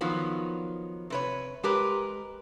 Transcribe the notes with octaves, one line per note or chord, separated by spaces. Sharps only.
D#3 F3 F#3 B3
C3 B4 C#5
G#3 G4 A#4 B4